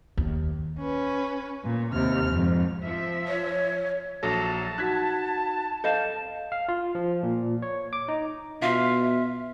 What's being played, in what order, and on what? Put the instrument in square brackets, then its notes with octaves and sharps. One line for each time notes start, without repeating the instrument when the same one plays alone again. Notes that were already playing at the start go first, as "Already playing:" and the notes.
[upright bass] D#2
[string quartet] C#4 B4
A#2
D#2 C3 F6
F2 G#2
[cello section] F3 E5
[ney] C#5
[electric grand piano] A#1 F#3 A4 [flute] A5 [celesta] A#6
[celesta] D#4 F#4 F#5 [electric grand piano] F#6 G#6 B6
[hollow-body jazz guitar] A4 D#5 F5 [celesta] G6 E7
[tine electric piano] F5
F4
F3
A#2
C#5
D6
D#4
[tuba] B2 [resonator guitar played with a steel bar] F4 [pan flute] E5